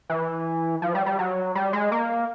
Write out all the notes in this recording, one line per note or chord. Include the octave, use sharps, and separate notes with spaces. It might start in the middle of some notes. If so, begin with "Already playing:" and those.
E3
F3
G3
G3
F#3
G3
G#3
A#3